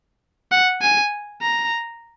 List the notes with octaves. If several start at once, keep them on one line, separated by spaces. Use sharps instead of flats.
F#5
G#5
A#5